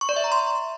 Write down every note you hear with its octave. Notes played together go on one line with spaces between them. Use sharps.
C#6
D5
E5
A#5
C6